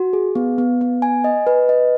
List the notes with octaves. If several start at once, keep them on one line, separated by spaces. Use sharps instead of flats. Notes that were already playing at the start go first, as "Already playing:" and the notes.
Already playing: F#4
G#4
B3
B3
B3
G#5
D#5
B4
D#5